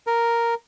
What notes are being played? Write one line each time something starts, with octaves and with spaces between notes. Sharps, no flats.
A#4